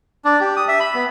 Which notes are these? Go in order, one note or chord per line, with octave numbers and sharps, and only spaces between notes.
D4
G4
D#6
E5
B5
B3